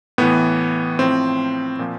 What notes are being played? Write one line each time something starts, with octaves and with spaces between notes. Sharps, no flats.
A2 E3 B3
A2 F3 C4
A#2 F3